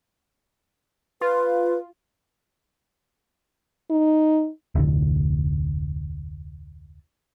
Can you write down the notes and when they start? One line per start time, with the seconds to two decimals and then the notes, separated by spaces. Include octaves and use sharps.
1.21 F4 B4
3.91 D#4
4.75 F1 D2 A2 D3